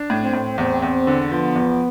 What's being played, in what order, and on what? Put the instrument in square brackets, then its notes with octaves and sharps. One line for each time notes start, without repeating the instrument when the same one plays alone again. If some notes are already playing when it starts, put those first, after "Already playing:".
Already playing: [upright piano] D4
A2
[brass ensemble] C4
[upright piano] A2
[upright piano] E2 [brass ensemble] C4
[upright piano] E2
D3
[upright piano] F3 [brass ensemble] B3
[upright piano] E2